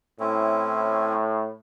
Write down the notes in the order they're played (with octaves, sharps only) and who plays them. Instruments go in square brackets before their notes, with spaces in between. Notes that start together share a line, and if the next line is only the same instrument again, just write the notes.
[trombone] A2 [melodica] C4 C#4 E4